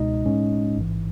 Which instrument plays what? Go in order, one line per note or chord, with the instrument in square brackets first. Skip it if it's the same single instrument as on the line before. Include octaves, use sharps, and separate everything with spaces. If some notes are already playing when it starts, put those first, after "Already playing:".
Already playing: [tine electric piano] C#2 B2 G#3 D#4 D#5
A2 G#3 C#4
A1 G#2 E3